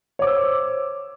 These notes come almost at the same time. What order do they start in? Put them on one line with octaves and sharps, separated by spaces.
C#5 D6 C5 E6